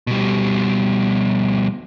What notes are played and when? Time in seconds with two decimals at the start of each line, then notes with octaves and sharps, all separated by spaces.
0.07 B2 G3